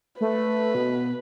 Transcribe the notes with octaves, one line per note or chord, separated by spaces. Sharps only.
A3 B4
B2